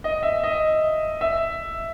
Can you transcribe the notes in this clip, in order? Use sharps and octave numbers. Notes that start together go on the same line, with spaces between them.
D#5
E5
D#5
E5